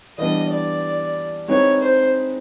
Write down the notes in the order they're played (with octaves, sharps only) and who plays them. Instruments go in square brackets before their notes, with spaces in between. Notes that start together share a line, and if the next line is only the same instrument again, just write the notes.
[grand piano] E3 G3 B3 D4 [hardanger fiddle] D#5
[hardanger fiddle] D5
[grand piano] G#3 C4 D#4 G#4 B4 [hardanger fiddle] C#5
[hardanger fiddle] C5